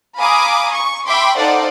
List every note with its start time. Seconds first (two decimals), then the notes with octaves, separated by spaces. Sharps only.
0.18 F5 G#5 A#5 B5 D6 D#6
0.72 C#6
1.05 E5 G5 B5 C6 D6
1.36 D#4 A4 C5 D5 F5 F#5